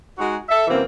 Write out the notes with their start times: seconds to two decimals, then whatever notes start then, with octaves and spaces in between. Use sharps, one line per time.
0.18 G#3 D#4 F#4
0.48 A4 E5
0.67 F#2 C3 E3 A#3 C4